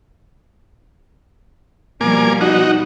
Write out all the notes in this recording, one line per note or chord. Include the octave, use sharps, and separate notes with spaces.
B2 F3 G3 A#3 G#5 D6
D#4 F#4